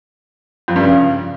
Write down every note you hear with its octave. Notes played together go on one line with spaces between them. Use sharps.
F2
G2
C#3